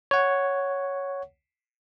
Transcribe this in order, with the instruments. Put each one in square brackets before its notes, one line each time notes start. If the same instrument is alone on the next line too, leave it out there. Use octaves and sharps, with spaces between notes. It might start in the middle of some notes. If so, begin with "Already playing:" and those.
[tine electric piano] C#5 F#5